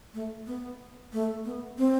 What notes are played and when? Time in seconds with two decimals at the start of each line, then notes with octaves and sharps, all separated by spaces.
0.14 A3
0.47 B3
1.13 A3
1.45 B3
1.78 C4